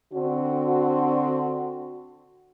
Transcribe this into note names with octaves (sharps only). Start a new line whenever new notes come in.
D3 C4 D4 F#4